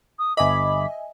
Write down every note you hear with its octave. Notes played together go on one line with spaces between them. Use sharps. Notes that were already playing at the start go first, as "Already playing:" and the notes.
D#6
G1 D#5 E5 G#5 B5 D6